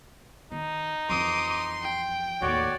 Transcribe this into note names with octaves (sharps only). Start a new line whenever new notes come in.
D#3 D#4
F2 E3 C6 D6 D#6
G5
D#2 A2 F#4 C#5 D5